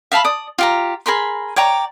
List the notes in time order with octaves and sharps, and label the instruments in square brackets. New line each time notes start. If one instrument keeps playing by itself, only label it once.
[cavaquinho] E5 F5 A5 B5
D5 D#6
F4 G4 A#5
G#4 A#4 B5 C6
C#5 D5 G5 A#5